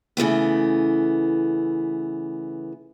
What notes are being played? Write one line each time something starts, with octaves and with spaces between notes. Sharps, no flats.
C#3 E3 A3 B3